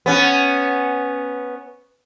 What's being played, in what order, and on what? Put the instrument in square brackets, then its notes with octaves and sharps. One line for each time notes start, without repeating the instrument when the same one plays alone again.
[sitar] B3 C#4